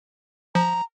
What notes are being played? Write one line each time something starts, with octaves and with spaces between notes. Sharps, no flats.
F3 A#5